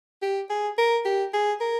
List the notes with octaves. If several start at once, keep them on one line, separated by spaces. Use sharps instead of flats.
G4
G#4
A#4
G4
G#4
A#4